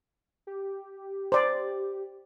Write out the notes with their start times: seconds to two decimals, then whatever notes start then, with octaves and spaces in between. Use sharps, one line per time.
0.47 G4
1.32 C5 D5